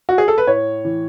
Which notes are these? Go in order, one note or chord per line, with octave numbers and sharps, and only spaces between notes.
F#4
G#4
A4
B4
A2 C#5
E3